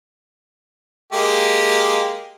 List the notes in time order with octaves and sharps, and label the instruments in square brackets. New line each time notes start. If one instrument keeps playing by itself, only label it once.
[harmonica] G#3 A#3 G4